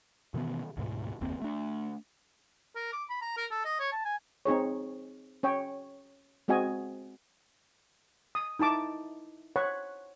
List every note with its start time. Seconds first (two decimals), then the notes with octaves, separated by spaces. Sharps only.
0.34 B2 D#3 E3 B3
0.77 D2 G#2 B2
1.21 F#1 D#2 A#3 C4
1.42 A3 D4
2.76 A#4
2.93 D6
3.09 B5
3.21 A#5
3.37 A#4
3.51 A4
3.65 D#5
3.79 C#5
3.92 A5
4.05 G#5
4.45 C4 D#4 G#4 C#5
5.43 C#4 C#5 G5
6.48 G#3 C4 F#4 D#5 G#5
8.35 D#6
8.59 D#4 E4 A5 D6
9.56 C5 C#5 F#5 B5 C#6